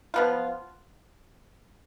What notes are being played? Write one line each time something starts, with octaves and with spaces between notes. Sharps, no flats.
F3 B3 F4